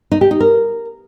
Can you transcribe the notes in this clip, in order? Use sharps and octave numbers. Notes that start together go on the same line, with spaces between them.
D#4
G4
D#4
A#4